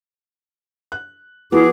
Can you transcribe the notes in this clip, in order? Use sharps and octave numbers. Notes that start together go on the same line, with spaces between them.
F#6
F3 B3 E4 F#4 G#4 B4 D6